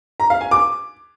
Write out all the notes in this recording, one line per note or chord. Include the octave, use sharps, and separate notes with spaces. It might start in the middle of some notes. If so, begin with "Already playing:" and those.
A#5
F5
G#5
D6